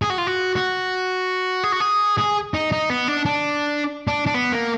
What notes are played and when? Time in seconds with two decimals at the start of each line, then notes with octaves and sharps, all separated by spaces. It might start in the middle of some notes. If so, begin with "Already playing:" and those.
0.02 G#4
0.10 F#4
0.18 F4
0.27 F#4
0.56 F#4
1.64 G#4
1.72 F#4
1.80 G#4
2.18 G#4
2.54 D#4
2.72 D#4
2.90 B3
3.08 D4
3.26 D4
4.08 D4
4.26 D4
4.34 B3
4.52 A#3